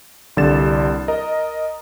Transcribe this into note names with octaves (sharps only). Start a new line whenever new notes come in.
C2 D3 G3 D5 A6 E7
A#4 D#5 A#5